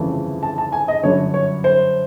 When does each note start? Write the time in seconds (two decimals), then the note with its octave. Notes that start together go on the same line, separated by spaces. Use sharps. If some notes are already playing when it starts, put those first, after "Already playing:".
Already playing: G1 F2 C#3 E3 A3
0.43 A5
0.58 A5
0.72 G#5
0.88 D#5
1.03 G1 F#2 D3 C#5
1.34 C#5
1.64 C5